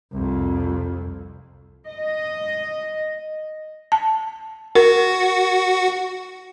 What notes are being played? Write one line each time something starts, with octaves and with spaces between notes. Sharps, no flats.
C2 F2
D#5
A5
F#4 A#4